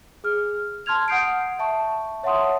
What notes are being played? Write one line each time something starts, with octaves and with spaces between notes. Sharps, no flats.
G#4 F6
A5 C6 F6 G#6 F7
F#5 D#6 G6 C7 D7
E5 A5 C#6
C#5 E5 F#5 A5 C6 D#6